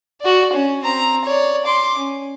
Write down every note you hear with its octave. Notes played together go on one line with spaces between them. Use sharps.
F#4 D5
C#4
C4 A#5
C#5 D5
C6 D6
C#4